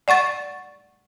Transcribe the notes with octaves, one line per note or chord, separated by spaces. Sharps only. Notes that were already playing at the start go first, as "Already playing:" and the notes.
D5 F#5 C#6 A6